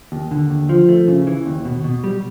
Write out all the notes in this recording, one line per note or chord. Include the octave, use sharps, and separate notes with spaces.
D#2
D3
D#2
F3
A3
C#3
E3
D#2
B2
B2
G3